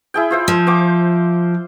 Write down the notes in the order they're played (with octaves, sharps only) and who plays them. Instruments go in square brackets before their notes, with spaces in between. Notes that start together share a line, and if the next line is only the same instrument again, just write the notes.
[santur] E4 G#4 G5
F4 C5 E5
[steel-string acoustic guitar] F3
[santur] C5 G5 D6